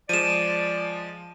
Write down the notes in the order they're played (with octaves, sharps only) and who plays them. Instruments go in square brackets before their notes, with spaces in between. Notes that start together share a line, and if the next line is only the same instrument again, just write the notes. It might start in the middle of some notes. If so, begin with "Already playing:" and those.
[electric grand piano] F3 G#3 [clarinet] D5 [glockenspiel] D#7 E7